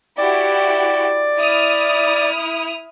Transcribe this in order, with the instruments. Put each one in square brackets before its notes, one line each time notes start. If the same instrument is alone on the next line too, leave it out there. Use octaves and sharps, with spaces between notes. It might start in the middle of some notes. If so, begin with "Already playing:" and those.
[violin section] E4 F#4 G4 [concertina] D5
[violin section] E4 D#6 F6